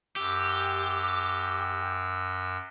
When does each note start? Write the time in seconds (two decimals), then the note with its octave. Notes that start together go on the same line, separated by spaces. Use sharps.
0.16 F#2 G4 E6